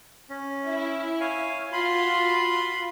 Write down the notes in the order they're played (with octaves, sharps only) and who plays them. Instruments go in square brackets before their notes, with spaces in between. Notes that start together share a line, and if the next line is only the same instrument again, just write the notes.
[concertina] C#4
[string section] E4
[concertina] C#5 F5 G#5
[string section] F4 F#4 [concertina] B5 C6